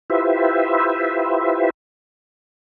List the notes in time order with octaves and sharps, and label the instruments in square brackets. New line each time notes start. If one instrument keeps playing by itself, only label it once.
[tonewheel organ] E4 F4 G4 B4 C5 E5